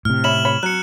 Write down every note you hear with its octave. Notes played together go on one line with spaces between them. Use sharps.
A2 C3 F6
C#5 E5 B5 E7 F#7
C#5 B5
F#3 F#6 C#7